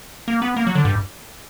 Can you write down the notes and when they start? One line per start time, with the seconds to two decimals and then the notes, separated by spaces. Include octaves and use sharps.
0.28 A#3
0.42 B3
0.57 A#3
0.67 F#3
0.75 D3
0.85 G2